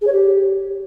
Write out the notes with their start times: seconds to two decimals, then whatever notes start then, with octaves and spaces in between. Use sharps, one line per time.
0.01 G#4
0.07 C#5
0.12 G4